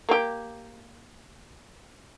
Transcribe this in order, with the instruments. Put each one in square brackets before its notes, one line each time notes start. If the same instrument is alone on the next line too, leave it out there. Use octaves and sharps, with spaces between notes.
[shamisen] A#3 G4